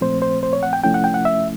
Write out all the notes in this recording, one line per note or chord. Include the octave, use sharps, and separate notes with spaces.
A#2 F3 A3 C4 C5
C5
C5
C#5
F#5
G5
C3 F3 A3 C#4 E4 G5
F#5
G5
F#5
E5